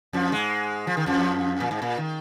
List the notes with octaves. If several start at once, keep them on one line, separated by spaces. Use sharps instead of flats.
F2 F3
G#2 G#3
F3
D#3
F2 F3
A#2
G#2
A#2
D#3